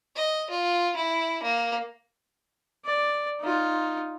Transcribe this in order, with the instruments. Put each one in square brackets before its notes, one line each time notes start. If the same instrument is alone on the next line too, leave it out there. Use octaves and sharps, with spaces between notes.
[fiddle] D#5
F4
E4
A#3
[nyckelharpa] D5
D#4 F4